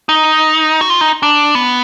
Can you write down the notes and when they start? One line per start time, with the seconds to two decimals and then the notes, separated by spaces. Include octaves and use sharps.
0.09 D#4
0.81 F#4
0.90 F4
1.01 D#4
1.23 D4
1.55 B3